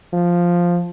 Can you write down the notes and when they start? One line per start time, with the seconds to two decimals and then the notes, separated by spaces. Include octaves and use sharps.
0.13 F3